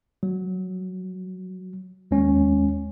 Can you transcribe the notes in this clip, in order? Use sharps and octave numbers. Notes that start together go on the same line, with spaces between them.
F#3
D#2 G#3 C#4